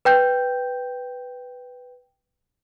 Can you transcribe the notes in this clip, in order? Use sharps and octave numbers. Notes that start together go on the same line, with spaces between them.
B4 G5 G6